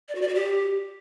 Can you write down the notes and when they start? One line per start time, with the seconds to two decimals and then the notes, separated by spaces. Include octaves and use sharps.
0.09 D5
0.15 F#4
0.22 D5
0.28 F#4
0.35 G4